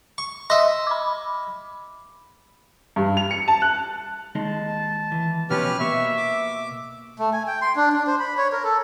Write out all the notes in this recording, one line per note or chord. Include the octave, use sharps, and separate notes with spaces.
C#6
D#5 E5 C6
B5 D6
G2
F7
C#7
A5
F#6
D#2 G#3 D#4 A5
E3
B2 D#3 F3 C#4 G4 B4 F6
B2 A#3 E5 C#6
D6
A3
G#5
G5
C6
D4
D4
C5
B5
C#5
A#4
A4